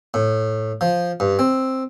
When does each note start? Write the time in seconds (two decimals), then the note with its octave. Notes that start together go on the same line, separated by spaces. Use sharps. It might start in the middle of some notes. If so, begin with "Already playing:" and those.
0.14 A2
0.81 F3
1.20 G2
1.39 C4